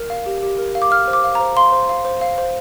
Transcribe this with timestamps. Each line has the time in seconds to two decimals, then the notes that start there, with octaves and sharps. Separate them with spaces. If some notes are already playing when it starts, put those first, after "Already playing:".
Already playing: A#4
0.10 F5
0.26 G4
0.43 G4
0.58 A#4
0.75 F5
0.82 D6
0.91 F5 F6
1.07 C5
1.13 D6
1.24 F5
1.35 A#5
1.40 C5
1.56 F5 C6
1.72 C5
1.89 F5
2.05 C5
2.21 F5
2.38 C5